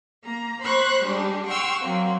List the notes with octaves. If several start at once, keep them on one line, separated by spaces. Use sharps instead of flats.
A#3 A#5
C5 B5 C#6 F#6
G3 G#3 D4 G4
F#5 G5 C6 C#6 E6 F6
F#3 A#3 C4